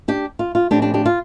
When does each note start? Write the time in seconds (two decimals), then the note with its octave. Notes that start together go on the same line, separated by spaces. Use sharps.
0.08 D4 G4
0.39 F4
0.55 F4
0.71 A2 F3 C4 D4 G4
0.82 D4 G4
0.94 D4 G4
1.06 F4